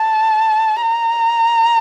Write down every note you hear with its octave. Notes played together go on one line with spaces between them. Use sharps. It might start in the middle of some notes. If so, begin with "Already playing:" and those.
Already playing: A5
A#5